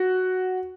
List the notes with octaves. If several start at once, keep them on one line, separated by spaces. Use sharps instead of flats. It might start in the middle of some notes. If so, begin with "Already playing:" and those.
Already playing: F#4